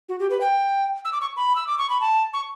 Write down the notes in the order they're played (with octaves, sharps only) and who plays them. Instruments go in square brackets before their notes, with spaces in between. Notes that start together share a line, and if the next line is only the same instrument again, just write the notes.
[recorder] F#4
G4
B4
G5
E6
D6
C#6
B5
E6
D6
C#6
B5
A5
C#6